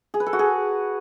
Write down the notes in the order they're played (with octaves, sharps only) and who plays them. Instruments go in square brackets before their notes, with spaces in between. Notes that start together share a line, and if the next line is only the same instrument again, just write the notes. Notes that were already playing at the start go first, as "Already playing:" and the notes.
[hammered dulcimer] G#4
B4
A4
F#4
G#4